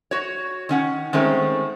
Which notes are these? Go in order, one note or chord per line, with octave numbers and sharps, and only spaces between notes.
F#4 C#5
D#3 C#4 F#5
D#3 G#3 A3 C4 C#4